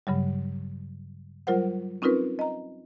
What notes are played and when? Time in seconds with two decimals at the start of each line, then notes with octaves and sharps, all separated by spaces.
0.07 G2 C#3 F#3 G3
1.47 F#3 G3 F4 A#4 C5 F#5
2.02 C4 C#4 D#4 F4 A#4 B4
2.39 D#5 A#5